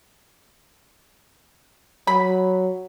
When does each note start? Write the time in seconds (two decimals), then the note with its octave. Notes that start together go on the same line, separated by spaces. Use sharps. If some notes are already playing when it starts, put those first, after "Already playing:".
2.07 F#3 B5